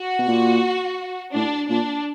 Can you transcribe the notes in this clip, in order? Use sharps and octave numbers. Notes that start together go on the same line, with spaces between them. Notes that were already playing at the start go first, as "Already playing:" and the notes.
Already playing: F#4
B2
A#2
A2 D4
A#2 D4